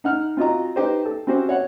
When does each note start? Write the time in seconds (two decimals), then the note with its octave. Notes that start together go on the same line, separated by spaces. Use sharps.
0.04 D#4 F#5 F6
0.37 C4 F4 F#4 D#5 A#5
0.76 D#4 G4 B4 C5
1.06 A4
1.27 C4 C#4 F#4 G4 C5
1.49 C#5 F#5